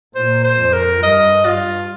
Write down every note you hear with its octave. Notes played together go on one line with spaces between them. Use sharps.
A#2 C5
C5
F2
A#4
G2 D#5
G2 F4